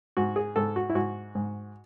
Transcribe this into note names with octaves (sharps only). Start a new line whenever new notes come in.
G#2 F#4
G#4
G#2 A4
F#4
E4
G#2 F#4
G#2